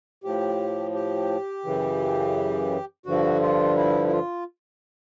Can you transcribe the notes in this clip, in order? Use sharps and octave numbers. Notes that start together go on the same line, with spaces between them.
A2 F3 G4
G4
F#2 C#3 E3
G2 D3 F3 F#4
F4
E4
E4
F4